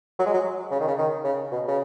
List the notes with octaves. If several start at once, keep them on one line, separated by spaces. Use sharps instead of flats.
F#3
G#3
F#3
C#3
D#3
C#3
D#3
C#3
B2
C#3